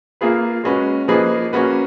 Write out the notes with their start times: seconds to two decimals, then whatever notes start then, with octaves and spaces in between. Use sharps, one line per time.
0.21 A#3 F4 G#4 B4
0.64 G#3 C#4 F#4 B4
1.08 F3 A#3 D#4 G#4 B4
1.53 A#3 C#4 F#4 B4